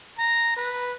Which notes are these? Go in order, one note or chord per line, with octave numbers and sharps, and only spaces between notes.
A#5
B4